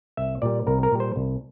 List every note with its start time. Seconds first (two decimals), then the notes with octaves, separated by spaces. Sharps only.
0.17 C2 E5
0.42 A#2 G3 D5
0.67 C2 A#4
0.83 A#4
0.92 A#2 G3
1.00 C5
1.16 C2